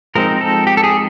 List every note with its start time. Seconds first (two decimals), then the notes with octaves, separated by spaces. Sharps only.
0.15 F3 G#3 C4 D#4 A#4
0.41 A4
0.67 G4
0.77 A4
0.84 G#4